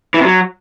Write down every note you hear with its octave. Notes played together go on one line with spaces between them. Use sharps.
E3
C3
F#3